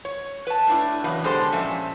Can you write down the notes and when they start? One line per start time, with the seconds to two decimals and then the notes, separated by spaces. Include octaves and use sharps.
0.05 C#5
0.47 B4 A5
0.67 A2 D4 E4
1.04 C#3 E3 F#3 B3
1.24 B2 D3 G#3 G4 A4 C5
1.52 A#2 F3 C#4 E5